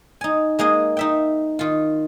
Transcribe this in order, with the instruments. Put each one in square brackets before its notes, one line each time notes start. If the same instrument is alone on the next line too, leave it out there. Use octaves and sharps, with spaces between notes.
[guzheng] D#4 G#5
G#3 A#3 G#4 D#5
D#4 E5 G5
D#3 F4